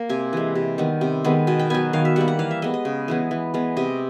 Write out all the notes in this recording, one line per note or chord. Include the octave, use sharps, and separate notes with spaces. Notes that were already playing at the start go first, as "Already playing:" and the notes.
Already playing: A#3
C3 G#5
E3 G#3
C3
D#3 G3 B3
C3
D#3 G#3 B3
B2 G#5
G5
F#3 B3 G#5
D#3 F5
E5
G3 A#3 F#5
F#5
E3 F5
E5
G#3 B3 D#5
D#5
C#3
E3 G#3 B3
E3
G#3 B3
C3 D#5